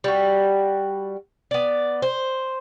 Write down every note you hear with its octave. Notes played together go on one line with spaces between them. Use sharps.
G3 F#4
B3 D5
C5